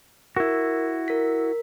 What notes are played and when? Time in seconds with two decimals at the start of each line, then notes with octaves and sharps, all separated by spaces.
0.36 E4 F#4 A#4
1.08 A#4 B6